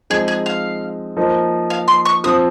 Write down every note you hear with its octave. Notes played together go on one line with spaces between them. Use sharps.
F3 G#3 C4 D#4 G#4
G#4
F5
F3 A#3 D#4
F5
C6
C#6
F3 C4 F4 D#6